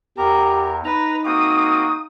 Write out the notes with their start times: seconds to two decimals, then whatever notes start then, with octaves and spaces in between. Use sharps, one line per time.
0.18 E2 G4 A#4
0.85 D#4 B4 A#5
1.25 A#3 C4 F#4 D#6